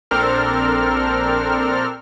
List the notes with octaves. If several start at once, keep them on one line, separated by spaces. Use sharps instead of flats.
A#1 C4 D4 A4 A#4 F6